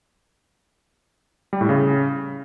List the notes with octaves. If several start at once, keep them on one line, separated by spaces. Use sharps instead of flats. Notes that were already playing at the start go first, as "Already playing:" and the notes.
G3
A2
C#3